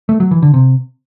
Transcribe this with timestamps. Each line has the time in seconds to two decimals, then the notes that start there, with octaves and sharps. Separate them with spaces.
0.09 A3
0.20 F#3
0.31 E3
0.42 D3
0.54 C3